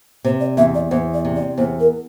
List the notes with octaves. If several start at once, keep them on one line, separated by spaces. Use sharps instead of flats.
C3 C5
D5
E2 E5
D5
E2 C5
D5
C3
D5
E2 C5
A#4